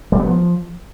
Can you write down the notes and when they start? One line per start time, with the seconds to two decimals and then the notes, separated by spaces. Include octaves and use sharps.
0.12 G3
0.19 B3
0.27 F3